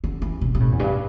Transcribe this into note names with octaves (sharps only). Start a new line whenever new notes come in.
D3
E3
C3
C3
A2
E2
G2